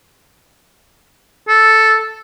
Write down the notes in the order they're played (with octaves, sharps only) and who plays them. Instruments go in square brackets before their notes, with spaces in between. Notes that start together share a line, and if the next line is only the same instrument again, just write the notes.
[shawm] A4